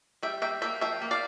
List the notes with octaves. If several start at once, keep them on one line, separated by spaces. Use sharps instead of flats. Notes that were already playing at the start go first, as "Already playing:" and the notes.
G3 E5 G5
A#3 E5 G5
A#3 E5 G5
F3 E5 G5
A#3
D5 F5